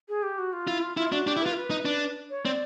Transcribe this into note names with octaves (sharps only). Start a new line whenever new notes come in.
G#4
G4
F#4
F4
E4 F4
F4
E4 F4
D4 F#4
D4 G4
E4
F4 B4
A#4
B4
D#4
D4
C#5
C4 D5